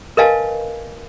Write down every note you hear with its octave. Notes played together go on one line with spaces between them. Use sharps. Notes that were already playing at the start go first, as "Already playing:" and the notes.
A#4 B4 D#5 F5 G#5 A5